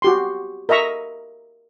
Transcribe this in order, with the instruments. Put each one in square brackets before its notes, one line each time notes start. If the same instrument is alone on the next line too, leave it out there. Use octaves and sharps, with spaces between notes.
[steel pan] F#4 G4 C6
A#4 D#5 E5 A#5 C#6